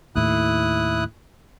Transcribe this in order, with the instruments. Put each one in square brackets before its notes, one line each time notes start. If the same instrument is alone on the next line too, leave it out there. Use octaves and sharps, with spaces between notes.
[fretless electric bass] D#2 A2 [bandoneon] E4 D#6 F#6